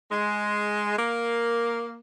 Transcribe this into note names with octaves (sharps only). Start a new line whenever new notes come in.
G#3
A#3